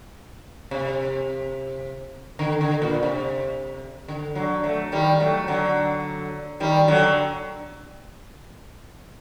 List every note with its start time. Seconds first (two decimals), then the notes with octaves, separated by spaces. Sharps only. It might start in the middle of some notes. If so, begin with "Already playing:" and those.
0.71 C3
2.39 D3
2.61 D3
2.82 A#2
3.03 C3
4.08 D3
4.35 D3 F#3
4.64 F#3 A3
4.92 D#3 G3
5.20 F#3 A3
5.48 D3 F#3
6.60 D#3 G3
6.88 D3 F#3